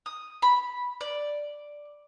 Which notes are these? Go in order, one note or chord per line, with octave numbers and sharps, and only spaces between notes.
D#6
B5
D5